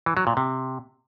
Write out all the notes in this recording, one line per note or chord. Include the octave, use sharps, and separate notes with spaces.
E3
F#3
A#2
C3